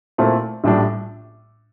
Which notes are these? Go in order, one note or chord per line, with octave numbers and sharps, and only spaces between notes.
A#2 A3 C4 E4 A4
A#1 A2 G3 D4